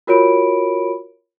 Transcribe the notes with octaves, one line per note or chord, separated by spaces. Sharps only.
F4 F#4 A#4 C#5 B5 D7